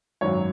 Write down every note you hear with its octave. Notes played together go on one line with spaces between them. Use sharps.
G#1 F#2 F#3 C#5